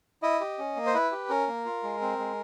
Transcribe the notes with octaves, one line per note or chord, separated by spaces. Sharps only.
E4 D#5
G4
C#4
A#3
C5
E4 B4
G4
C#4 A#4
A#3
F4
G#3
C4
G#3